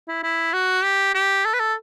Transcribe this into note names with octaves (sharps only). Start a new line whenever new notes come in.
E4
E4
F#4
G4
G4
A4
B4
A4